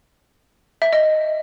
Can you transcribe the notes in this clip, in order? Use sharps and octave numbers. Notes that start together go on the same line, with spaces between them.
E5
D#5